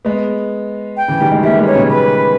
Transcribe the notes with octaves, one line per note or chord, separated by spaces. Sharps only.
G#3 B3
G5
C#3 E3
D#3 G3
E3 G#3
G3 A#3 E5
G#3 B3
C#5
A#2 C#3
B4